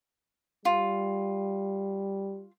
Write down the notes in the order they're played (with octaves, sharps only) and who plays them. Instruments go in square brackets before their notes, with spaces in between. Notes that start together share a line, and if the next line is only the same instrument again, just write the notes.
[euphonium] G3 [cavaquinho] F4